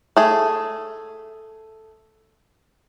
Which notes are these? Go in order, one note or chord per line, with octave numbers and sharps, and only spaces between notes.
A3 G#4